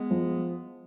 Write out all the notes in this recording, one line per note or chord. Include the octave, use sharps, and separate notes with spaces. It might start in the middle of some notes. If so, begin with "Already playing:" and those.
Already playing: G#3 B3
F3